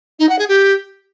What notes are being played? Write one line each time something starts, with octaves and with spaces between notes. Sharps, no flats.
D#4
F#5
G#4
G4